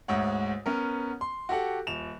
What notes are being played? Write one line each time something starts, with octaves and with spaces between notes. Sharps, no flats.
D2 G#2 C#5 F#5
B3 C#4 A#4
C6
F#4 G4 A4 F#5
D#1 E7 F7